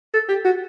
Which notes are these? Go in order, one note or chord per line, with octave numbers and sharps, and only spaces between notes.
A4
G4
F#4